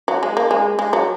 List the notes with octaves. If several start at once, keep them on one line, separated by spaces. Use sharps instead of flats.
F#3
G#3
A#3
G#3
G#3
F#3